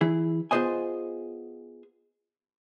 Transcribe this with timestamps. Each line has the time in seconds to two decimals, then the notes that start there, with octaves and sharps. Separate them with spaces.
0.01 E3 E4 G#4
0.51 B3 F4 G#4 C5 D#5 G#5